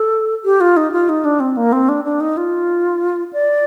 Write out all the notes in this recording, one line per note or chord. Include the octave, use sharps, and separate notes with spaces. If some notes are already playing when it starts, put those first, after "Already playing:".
Already playing: A4
G4
F4
D#4
F4
D#4
D4
C4
A#3
C4
D4
D4
D#4
F4
D5